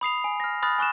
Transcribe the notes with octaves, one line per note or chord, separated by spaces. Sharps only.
B5 D#6 C7 F7
G#5
F6 A#6
B5 D#6 F6 F#6 A6
G#5 C#6 F#6 E7